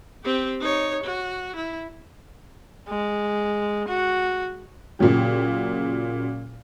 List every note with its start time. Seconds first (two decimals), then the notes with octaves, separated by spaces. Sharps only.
0.24 C4 G4
0.61 D#4 C#5
1.04 F#4
1.56 E4
2.88 G#3
3.88 F#4
4.99 A#2 C#3 F#3 G4